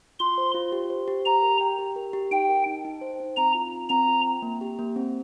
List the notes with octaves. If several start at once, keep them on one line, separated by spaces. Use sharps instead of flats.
F4 C6
C5
F4
G4
C5
G4
G4 A#5
A#4
G5
G4
A#4
G4
D#4 G5
A#4
D#4
D#4
C5
D#4
C4 A#5
F4
C4
C4 A#5
F4
G5
A#3
G4
A#3
C4